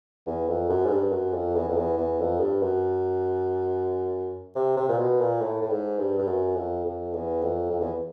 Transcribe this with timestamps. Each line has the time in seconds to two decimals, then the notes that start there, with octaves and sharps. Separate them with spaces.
0.26 E2
0.48 F2
0.69 F#2
0.85 G#2
0.90 G2
1.12 F#2
1.33 F2
1.55 E2
1.68 F2
1.76 E2
1.98 E2
2.19 F2
2.41 G2
2.62 F#2
4.56 C3
4.77 C3
4.89 A#2
4.98 B2
5.20 A#2
5.42 A2
5.62 A2
5.70 G#2
5.99 G2
6.19 G2
6.27 F#2
6.56 F2
6.85 F2
7.13 E2
7.42 F2
7.70 F2
7.81 E2